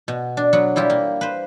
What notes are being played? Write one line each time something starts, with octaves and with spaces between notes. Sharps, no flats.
B2
D4
F#3 B3 F#5
G3 E4 F4 G4
A#3
B4 C5